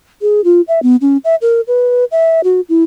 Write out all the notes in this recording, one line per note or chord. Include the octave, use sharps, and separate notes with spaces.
G#4
F4
E5
B3
C#4
E5
A#4
B4
E5
F#4
E4